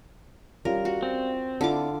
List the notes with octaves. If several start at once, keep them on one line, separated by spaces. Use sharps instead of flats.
G3 C#4 F4 A#4
F#4
C4
D3 D4 E4 F4 D6